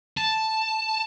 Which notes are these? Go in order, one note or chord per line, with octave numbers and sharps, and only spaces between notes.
A5